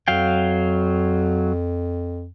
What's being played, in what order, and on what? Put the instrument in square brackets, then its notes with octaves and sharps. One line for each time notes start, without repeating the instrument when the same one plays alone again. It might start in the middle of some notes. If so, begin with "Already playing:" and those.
[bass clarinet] F2 [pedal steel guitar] F#3 F5 G5